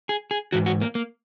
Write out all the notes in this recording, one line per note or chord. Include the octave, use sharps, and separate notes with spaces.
G#4
G#4
G#2 E3 F#4
F#4
A#3
A#3